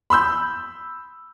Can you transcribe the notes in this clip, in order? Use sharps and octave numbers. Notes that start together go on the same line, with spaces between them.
B5 C6 E6 G6